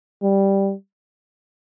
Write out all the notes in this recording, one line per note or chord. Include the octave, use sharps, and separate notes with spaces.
G3